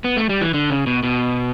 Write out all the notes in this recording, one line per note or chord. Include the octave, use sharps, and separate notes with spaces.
B3
A3
G3
E3
D3
C#3
B2
B2